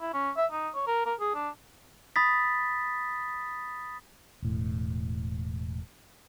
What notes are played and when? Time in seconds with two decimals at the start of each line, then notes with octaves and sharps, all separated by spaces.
0.01 E4
0.13 C#4
0.37 E5
0.52 D#4
0.75 C#5
0.87 A#4
1.06 A#4
1.20 G#4
1.35 D4
2.16 B5 D#6 A6 B6
4.42 E1 A2